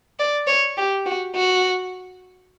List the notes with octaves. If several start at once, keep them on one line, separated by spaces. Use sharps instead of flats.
D5
C#5
G4
F#4
F#4